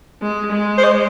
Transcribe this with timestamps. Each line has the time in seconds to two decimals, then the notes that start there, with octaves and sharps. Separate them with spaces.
0.22 G#3
0.52 G#3
0.78 C5
0.84 D#5